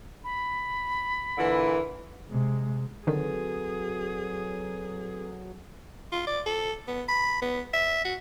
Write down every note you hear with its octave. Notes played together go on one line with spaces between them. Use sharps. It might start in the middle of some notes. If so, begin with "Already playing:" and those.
B5
A#2 D3 E3
C3 G#3
D3 D#3 F#3 C4 G#4 A4 B4
F4
D5
A4
B3
B5
B3
E5
F#4